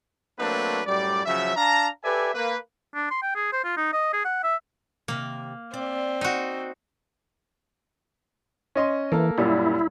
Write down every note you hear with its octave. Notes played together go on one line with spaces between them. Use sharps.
F#3 A3 A#3 C4 D4 B4
F#2 A2 G3 D5
C#3 F3 F#3 E5
D4 F5 A5 A#5
G4 A4 B4 D5 E5 G#5
A#3 B4
D4
C6
G5
G#4
C5
F4
D#4
D#5
G#4
F#5
E5
C3 D#3 A#3
C4 D5
D#4 F#4
C#4 D#5 C6
E3 A#3 A4 A#4
F#2 A#2 G3 E4